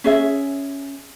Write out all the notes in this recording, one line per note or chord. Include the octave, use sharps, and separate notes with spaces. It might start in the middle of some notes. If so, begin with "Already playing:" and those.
C#4 G#4 E5